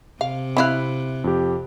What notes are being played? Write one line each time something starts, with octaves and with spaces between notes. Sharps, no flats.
C3 F5
C4 E4 F5 B5 F#6
F2 G4